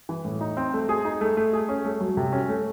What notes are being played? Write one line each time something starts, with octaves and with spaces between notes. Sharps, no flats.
E3
A2
D#4
C4
A3
G#4
D#4
A3
A3
G#4
C#4
A3
F#3
C3
C#4
A3